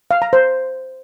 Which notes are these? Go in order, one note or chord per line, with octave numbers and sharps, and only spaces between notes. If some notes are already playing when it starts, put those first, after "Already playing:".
F5
A#5
C5